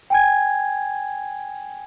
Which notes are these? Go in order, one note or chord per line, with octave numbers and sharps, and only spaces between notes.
G5 G#5 G#6